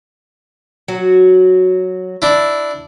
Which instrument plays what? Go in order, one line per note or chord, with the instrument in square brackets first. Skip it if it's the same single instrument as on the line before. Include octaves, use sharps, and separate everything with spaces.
[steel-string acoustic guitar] F#3 F#4
[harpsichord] D4 E4